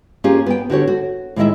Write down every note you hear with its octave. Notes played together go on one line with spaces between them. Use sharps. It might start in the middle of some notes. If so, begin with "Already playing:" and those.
A#3 C#4 F4 G4 G#4
B3 G5
D3 F#4 G4 C#5
F#4
A2 D#3 G#3 E4 D#5 E5